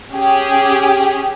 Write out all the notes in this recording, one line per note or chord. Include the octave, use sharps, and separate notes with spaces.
C#4 G4 G#4